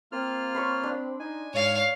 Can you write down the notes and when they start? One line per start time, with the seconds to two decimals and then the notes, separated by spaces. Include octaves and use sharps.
0.12 A#3 C4 F4 F6
0.55 C#5 B5 C6
0.83 D4
1.20 D#4 G#5
1.54 G#2 C#5 F5